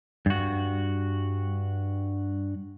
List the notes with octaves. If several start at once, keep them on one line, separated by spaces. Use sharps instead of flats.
G2 F#4